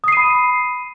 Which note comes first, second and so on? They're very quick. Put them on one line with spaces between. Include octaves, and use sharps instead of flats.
D#6 C7 D#7 B5